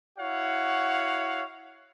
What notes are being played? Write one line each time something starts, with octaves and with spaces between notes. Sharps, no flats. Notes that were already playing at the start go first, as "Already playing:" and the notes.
E4 F#4 C#5 F5 F#5